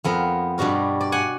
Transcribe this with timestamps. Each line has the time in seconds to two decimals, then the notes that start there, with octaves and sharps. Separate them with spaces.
0.04 F2 B3 A#4
0.58 G2 B2 G3 F#4 A#4
1.01 D5
1.12 F#5 G#5